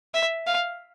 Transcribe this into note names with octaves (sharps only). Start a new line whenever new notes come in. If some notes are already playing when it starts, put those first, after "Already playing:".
E5
F5